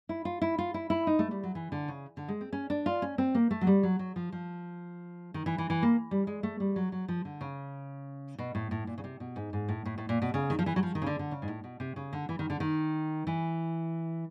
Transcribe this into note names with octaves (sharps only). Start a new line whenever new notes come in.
E4
F4
E4
F4
E4
E4
D#4
A3
G3
F#3
E3
D3
C#3
D3
G#3
C4
C#4
D4
F4
C#4
C4
A#3
A3
F#3
G3
F#3
F#3
F3
F3
D#3
E3
E3
E3
A#3
G3
G#3
A3
G3
F#3
F#3
F3
D3
C#3
B2
A2
A2
A#2
C#3
C3
B2
G#2
G#2
A2
A2
A2
A#2
B2
C#3
D#3
F3
E3
F#3
F3
D#3
C#3
D3
D3
C#3
G#2
A2
B2
C3
C#3
D3
E3
D#3
D3
D#3
E3